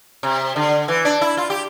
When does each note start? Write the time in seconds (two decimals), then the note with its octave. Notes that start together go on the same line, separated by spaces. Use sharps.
0.23 C3
0.56 D3
0.88 E3
1.05 D4
1.21 E4
1.37 F4
1.50 G4